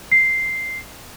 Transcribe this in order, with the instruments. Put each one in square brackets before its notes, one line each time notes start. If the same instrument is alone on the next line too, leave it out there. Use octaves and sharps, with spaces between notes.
[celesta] C7